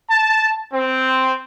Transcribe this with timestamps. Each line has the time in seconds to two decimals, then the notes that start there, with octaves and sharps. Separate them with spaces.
0.11 A5
0.73 C4